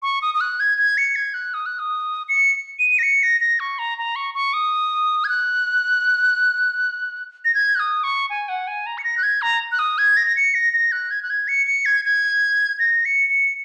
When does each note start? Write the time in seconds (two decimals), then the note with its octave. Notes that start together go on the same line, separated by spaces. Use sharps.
0.03 C#6
0.22 D#6
0.35 D#6
0.41 F#6
0.60 G#6
0.78 G#6
0.98 C#7
1.16 G#6
1.34 F#6
1.54 D#6
1.66 F#6
1.79 D#6
2.29 C#7
2.79 D#7
2.99 A#6
3.03 C#7
3.23 A#6
3.41 A#6
3.60 C#6
3.79 A#5
3.98 A#5
4.16 C#6
4.34 C#6
4.54 D#6
5.24 G#6
5.29 F#6
7.45 A#6
7.55 G#6
7.75 F#6
7.80 D#6
8.04 C#6
8.30 G#5
8.49 F#5
8.67 G#5
8.86 A#5
8.98 C#7
9.04 A#6
9.18 F#6
9.23 G#6
9.42 A#5
9.72 F#6
9.79 D#6
9.98 G#6
10.17 A#6
10.27 A#6
10.36 C#7
10.54 A#6
10.73 A#6
10.92 F#6
11.11 G#6
11.23 F#6
11.30 G#6
11.48 C#7
11.67 C#7
11.85 G#6
12.05 G#6
12.79 A#6
13.05 C#7
13.30 C#7